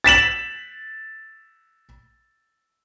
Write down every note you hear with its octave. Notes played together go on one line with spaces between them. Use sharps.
A6 B6 E7 F#7